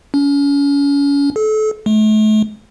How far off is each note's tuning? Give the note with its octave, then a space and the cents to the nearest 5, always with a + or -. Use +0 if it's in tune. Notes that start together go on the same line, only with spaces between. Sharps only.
C#4 +35
A4 -30
A3 -35